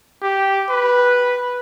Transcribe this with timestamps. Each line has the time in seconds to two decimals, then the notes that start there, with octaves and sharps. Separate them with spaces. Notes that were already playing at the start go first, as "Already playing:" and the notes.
0.22 G4
0.69 B4